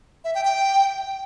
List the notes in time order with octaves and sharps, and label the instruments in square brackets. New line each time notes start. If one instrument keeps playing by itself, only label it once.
[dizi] E5
G5
G5